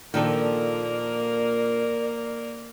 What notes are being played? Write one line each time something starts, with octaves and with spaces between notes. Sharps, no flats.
A#2 D#3 F3 A#3 D4 A4 A#4 D5